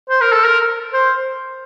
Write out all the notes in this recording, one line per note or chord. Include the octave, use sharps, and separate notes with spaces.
C5
A#4
A4
A#4
C5